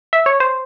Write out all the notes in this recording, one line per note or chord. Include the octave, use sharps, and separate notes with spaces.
E5
C#5
C5